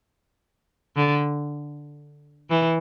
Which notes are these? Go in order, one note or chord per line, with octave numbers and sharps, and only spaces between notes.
D3
E3